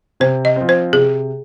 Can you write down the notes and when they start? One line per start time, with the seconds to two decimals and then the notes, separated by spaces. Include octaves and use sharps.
0.20 C3 C5
0.45 D#5
0.56 F3 C4
0.69 C5
0.93 C3 G#4